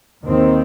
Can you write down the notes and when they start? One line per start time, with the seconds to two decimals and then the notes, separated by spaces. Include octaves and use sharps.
0.24 D#2 D#3 C4